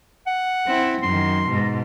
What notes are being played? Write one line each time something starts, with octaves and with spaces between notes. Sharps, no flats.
F#5
C4 E4
F#2 D#3 C6
G#2 B2